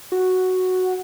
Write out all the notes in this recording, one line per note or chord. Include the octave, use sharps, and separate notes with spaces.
F#4